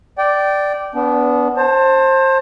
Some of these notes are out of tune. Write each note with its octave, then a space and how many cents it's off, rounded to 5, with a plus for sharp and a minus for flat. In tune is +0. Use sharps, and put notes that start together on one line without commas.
D5 +0 G5 -20
B3 +0 D4 -30
C5 +25 A5 +25